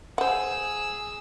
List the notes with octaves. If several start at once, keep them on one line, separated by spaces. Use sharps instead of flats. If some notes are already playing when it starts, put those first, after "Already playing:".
G#4 C5 F#5 E6